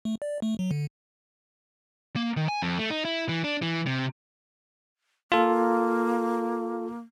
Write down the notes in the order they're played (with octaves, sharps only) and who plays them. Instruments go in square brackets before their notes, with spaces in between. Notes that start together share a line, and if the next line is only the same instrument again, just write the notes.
[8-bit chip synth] A3
D5
A3
F#3
D3
[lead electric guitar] A#3
D#3
G#5
F2
A3
D#4
E4
E3
D4
E3
C3
[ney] A#3 [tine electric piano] F4 A4